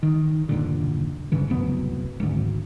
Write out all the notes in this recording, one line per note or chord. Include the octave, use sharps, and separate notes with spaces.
D#3
F#1 D#2 A#2 D3
F#1 G2 C#3 E3
D1 C2 F#2 B3
G#1 D2